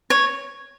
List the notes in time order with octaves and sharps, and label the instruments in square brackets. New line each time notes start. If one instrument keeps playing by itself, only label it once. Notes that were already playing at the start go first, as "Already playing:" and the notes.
[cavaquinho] C#5